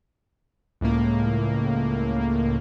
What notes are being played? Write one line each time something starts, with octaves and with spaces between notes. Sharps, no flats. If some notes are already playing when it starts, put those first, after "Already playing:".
C#2 A2 A#3